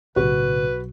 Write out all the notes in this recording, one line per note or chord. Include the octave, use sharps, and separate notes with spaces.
B1 A2 C#3 F#3 F#4 B4